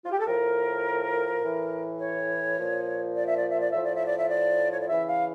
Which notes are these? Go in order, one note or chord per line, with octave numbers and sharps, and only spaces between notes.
F4
G4
A4
A2 F3 A#4
A2 E3
C#5
A#2 F3
D5
E5
D5
E5
D5
A2 F3 E5
D5
E5
D5
E5
D5
C#5
D5
C#3 E3 E5
F5